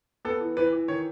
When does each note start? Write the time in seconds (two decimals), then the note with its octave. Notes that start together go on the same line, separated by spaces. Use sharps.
0.25 B3 A4
0.40 E3
0.57 E3 B4
0.72 E3
0.88 D#3 C#5